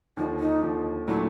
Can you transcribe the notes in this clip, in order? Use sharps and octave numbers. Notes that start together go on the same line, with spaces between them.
D#2 D3 F3 D#4
D#4
D#2 D3 F3
A#2 F#3 A3 D4 E4